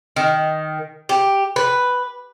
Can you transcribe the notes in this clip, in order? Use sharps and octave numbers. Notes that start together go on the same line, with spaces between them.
D#3
G4
B4